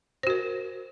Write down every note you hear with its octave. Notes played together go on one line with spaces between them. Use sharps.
F#4 A#4 C5